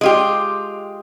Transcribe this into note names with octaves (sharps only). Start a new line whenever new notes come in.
G#3 F4 G4